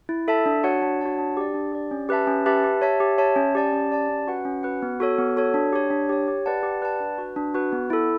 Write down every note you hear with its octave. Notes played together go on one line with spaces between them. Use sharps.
E4
A4 E5 A5
D4
F#4 C#5 F#5 A5
D4
F#4 C#5 F#5 A5
D4
G4 D5
D4
G4 D5
C#4
G4 B4 E5 A5
C#4
G4 B4 E5 A5
G4
C#5 E5 A5
G4
C#5 E5 A5
C#4
G4 D5 A5
C#4
G4 D5 A5
C#4
F#4 B4 F#5
C#4
F#4 B4 F#5
B3
F#4 A4 C#5
B3
F#4 A4 C#5
D4
G4 C#5
D4
G4 C#5
G4
B4 D5 F#5 A5
G4
B4 D5 F#5 A5
D4
F#4 B4
D4
F#4 B4
B3
E4 A4